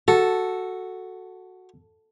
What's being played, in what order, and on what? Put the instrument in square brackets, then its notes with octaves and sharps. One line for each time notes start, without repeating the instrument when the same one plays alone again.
[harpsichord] F#4 [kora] A4